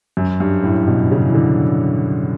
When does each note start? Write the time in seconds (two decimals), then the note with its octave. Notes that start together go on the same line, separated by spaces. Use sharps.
0.17 F#2
0.40 G2
0.64 A2
0.88 B2
1.11 C#3
1.28 E3
1.35 D3